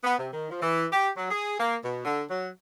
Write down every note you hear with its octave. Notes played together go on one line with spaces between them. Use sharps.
B3
C3
D#3
F3
E3
G4
F#3
G#4
A#3
B2
D3
F#3